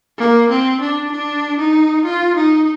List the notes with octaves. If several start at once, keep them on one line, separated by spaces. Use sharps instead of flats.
A#3
C4
D4
D4
D#4
F4
D#4